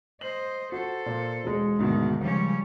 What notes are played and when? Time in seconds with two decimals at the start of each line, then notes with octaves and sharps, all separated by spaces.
0.21 C5 D#5 F#7
0.72 F#4 A4 C5
1.06 A#2
1.44 E1 G#3
1.79 D2 G#2 B2 D#3
2.21 C#2 F3 G3 C#4